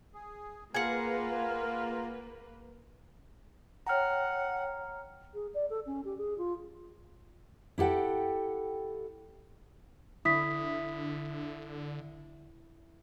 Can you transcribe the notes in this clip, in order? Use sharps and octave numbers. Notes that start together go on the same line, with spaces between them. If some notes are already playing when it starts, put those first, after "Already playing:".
G#4
A#3 F4 G#4 A#4 B4 F5 F#5
C#5 F#5 G5 A#5 F6
G#4
D5
A4
C#4
G4
G#4
F4
E4 G4 A4 F#5 G5
D3 E4 D#6 B6